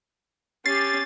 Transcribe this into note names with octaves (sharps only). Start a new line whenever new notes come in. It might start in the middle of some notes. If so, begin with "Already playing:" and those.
C#4 G4 A6 C7